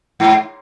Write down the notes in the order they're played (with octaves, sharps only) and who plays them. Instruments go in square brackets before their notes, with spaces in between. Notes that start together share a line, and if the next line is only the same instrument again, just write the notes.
[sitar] G#2